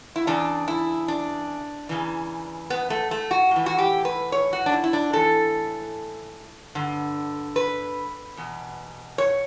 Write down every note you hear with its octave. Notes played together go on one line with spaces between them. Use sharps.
E4
E2 C#3 D4
E4
D4
E2 C#3 E3
B3
A3
A3
F#4
A2 E3
F#4
G4
B4
C#5
F#4
D4
E4
E4
D4
A2 E3 A4
G2 D3
B4
E2 B2
C#5